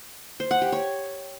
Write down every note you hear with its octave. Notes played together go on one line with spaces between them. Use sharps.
C5
F#5
G4
C#5